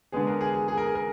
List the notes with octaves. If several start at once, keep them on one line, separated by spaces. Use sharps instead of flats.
D3 G#3 B3 G#4
A#4
G#4
G#4
G#4
A#4
G#4
A#4